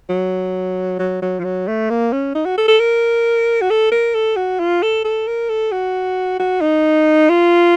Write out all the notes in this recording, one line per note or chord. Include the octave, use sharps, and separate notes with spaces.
F#3
F#3
F#3
F3
F#3
A3
A#3
C#4
D#4
F#4
A4
A4
A#4
F#4
A4
A#4
A4
F#4
F4
A4
A4
A#4
A4
F#4
F#4
D#4
F4